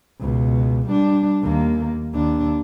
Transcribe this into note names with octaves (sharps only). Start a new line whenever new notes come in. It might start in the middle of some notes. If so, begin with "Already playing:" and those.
C#2 B2
G3 D4
D#2 A#3
D#2 D4